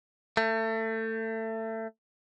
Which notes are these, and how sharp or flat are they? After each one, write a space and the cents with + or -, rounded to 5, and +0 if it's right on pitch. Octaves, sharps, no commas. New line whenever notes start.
A3 +25